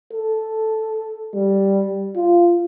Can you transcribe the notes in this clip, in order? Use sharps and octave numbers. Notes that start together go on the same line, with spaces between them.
A4
G3
F4